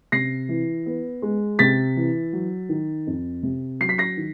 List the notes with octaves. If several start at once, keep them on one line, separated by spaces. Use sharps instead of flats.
C3 A#6 C7
E3
B3
G#3
C3 A6 B6
E3
F#3
D#3
F2
C3
F#3 C7
B6
A#6 C7
D#3